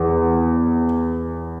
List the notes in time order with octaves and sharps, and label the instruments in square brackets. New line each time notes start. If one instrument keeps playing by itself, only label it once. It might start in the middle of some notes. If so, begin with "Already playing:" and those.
Already playing: [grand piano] E2